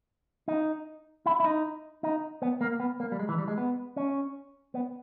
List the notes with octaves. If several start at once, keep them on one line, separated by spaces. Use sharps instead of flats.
D#4
E4
E4
D#4
D#4
B3
A#3
B3
A#3
G3
G#3
E3
G3
G#3
B3
C#4
B3